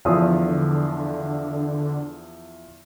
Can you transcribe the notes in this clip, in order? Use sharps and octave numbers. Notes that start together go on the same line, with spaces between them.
E2 D3 F3 D#6